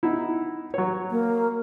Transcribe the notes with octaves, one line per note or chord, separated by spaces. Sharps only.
B3 D#4 E4
F#3 C#5
A#3